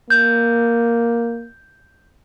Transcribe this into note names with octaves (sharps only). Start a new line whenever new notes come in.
A#3 G6